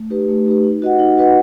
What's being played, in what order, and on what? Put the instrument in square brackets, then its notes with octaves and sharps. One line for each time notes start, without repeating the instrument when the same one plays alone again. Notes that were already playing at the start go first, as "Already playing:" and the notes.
Already playing: [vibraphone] A3
D#4 G4 B4
A3
D#4 G4 B4
D#4
F#4 B4 D#5 F#5
D#4
F#4 B4 D#5 F#5